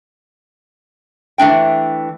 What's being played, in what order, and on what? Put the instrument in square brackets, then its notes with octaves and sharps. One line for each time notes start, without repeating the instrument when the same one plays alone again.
[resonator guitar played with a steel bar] E3 A3 D4 G5